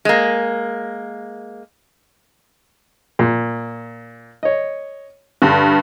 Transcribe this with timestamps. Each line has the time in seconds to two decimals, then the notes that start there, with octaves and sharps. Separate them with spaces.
0.05 G#3 A#3
3.19 A#2
4.43 C#5 D#5
5.42 G2 D3